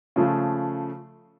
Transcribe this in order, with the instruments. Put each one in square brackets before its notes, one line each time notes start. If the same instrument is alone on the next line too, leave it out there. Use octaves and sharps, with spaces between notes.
[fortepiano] C#3 F3 A3